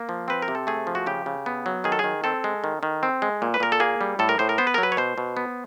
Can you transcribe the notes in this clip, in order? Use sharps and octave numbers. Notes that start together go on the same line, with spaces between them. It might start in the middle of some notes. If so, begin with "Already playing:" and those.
Already playing: A#3
F3
C4 B4
A#4
C3
A4
A3 G#4
F3
F#4
C#3 G4
C#3
B3
F#3
D#3 G#4
A4
D#3 G#4
C4 A4
G#3
D#3
D#3
C4
G#3
A#2
B4
A#2 A#4
A4
A#3 G#4
G3
A2 A4
A#4
A2 C5
A#4
B3 C5
B4
A#4
F#3
B4
C#5
B2 C5
B2
B3